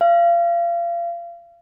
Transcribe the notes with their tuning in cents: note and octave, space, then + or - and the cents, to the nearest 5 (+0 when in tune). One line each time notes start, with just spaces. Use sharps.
F5 -30